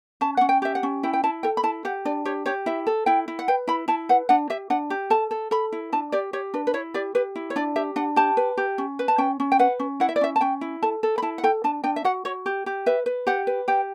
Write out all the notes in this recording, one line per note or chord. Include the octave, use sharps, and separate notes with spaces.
C#4 A5
C#4 F#5
G5
G4 E5
F#5
C#4
E4 G5
G5
E4 A5
A4 G5
B5
E4 A5
G4 F#5
D4 D5
G4 C#5
G4 C#5
E4 E5
A4
E4 G5
E4
F#5
B4 G5
E4 B5
E4 A5
B4 F#5
D4 F#5
G4 E5
D4 F#5
G4
A4 A5
A4
A4 B5
E4
D4 A5
G4 D5
G4 C#5
D4 B4
B4
E4 C#5
G4 D5
G4 B4
E4
C#5
D4 D5
G4 E5
D4 F#5
G4 A5
B4
G4
C#4
B4
A5
C#4 G5
C#4
G5
B4 F#5
C#4
E4 F#5
E5
D5
C#4 E5
A5
C#4 G5
E4
A4 A5
A4
B5
E4 A5
F#5
A4 G5
D4 A5
D4 G5
E5
F#4 F#5
F#4 C#5
G4
G4
B4 E5
B4
G4 F#5
B4
G4 G5